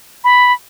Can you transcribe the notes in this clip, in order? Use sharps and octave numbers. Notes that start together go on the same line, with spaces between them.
B5